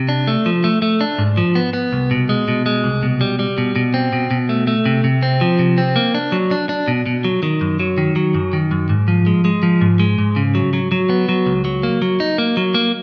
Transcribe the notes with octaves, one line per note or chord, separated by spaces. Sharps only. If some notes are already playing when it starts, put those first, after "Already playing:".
Already playing: C3
D4
A3
F3
A3
A3
D4
G#2
F3
B3
B3
C2
B2
G#3
B2
G#3
C2
B2
G3
G3
B2
B2
C4
B2
B2
A3
A3
C3
C3
C4
F3
C3
C4
A#3
D4
F#3
D4
D4
B2
B2
F#3
D#3
F#2
F#3
D#3
F#3
F#2
D#3
F#2
G#2
F3
G#3
G#3
F3
G#2
G#3
G#2
C#3
F#3
F#3
F#3
B3
F#3
C#2
F#3
A#3
F#3
D#4
A#3
F#3
A#3